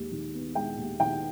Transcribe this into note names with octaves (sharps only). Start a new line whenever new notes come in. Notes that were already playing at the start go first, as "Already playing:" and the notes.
Already playing: D#2 G#3
D#3
B3
G#3 G5
D#2
D#3 G5